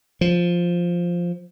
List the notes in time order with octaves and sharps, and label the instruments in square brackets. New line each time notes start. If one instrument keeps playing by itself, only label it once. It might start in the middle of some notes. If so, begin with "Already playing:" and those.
[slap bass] F3